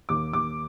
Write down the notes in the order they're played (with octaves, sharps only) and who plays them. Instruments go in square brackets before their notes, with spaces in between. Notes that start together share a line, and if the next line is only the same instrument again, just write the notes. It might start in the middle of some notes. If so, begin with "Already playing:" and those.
[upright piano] D#2 D6
D#2 D6